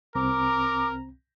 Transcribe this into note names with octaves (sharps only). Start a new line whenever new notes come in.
C2 C4 A#4 A#5 D6